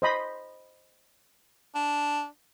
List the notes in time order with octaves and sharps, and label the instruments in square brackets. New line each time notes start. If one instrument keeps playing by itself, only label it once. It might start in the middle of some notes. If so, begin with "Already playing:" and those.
[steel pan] C5 D#5 B5
[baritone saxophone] D4